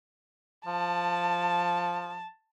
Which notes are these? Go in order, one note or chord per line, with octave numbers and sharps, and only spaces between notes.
F3 A5